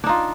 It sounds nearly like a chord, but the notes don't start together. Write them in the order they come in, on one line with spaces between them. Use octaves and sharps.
D4 D#4 F4